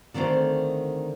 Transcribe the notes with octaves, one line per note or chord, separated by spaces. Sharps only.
D3 D#3 A3 C4 C5